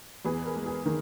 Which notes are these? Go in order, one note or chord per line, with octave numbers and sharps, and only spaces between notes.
E2 G#4 B4
A#4
G#3
G#4
D#3 A#4